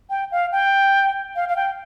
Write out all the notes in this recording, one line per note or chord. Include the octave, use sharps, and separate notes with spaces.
G5
F5
G5
F5
F5
G5